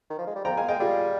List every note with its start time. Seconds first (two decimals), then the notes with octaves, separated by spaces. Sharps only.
0.10 D#3
0.19 F3
0.27 G#3
0.35 G3
0.44 F3 G5 A#5
0.57 G#3 F5 G#5
0.68 G#3 D#5 G5
0.80 G3 F4 G#4